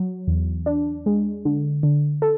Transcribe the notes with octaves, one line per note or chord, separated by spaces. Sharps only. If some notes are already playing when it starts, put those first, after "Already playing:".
Already playing: F#3
E2
D4
G#3
D3
D3
A4